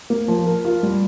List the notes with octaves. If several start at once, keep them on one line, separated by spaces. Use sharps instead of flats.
A#3
F3
A#4
F4
G3